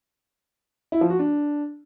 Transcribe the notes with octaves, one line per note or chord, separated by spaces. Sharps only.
E4
F3
F#4
D4